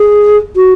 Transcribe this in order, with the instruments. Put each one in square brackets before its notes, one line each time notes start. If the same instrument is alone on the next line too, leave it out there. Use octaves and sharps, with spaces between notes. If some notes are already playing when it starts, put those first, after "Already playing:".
Already playing: [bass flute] G#4
F#4